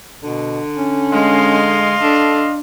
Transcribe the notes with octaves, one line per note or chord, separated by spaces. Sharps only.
B2 D3
C#4
G#3 D#5 F5 C6
D4 A4